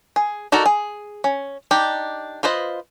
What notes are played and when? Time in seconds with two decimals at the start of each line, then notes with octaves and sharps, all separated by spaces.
0.16 G#4
0.52 D#4 F#4 A4 A#4 D5
0.66 G#4
1.24 C#4
1.71 D4 D#4 G4
2.43 F4 B4 C5 D#5